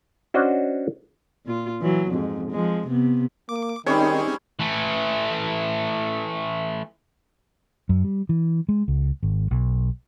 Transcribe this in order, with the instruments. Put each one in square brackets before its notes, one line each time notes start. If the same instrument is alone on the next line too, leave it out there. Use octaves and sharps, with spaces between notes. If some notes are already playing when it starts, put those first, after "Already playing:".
[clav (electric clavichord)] C#4 D4 F#4 C5 D#5
[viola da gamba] A#2 F4
E3 F#3
F2 G#2
F3 G#3
C3 B3
[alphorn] A#3 [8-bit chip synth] D6
[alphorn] D#3 [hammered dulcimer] G3 C#5 [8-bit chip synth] C4 C#4 G#4 [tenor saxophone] D#4
[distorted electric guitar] E3 A3
[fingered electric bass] F#2
G3
E3
G#3
C#2
G#1
B1